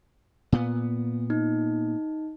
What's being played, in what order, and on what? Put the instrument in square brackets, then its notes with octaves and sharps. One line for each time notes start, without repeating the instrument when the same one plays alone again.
[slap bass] A#2 B3
[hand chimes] D#4